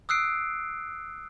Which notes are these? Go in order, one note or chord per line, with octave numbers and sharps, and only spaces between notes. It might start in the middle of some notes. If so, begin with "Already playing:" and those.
D#6 E6 F#6 C7 D7